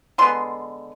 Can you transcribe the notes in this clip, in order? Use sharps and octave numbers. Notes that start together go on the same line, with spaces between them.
D3 F3 G#3 B3 C6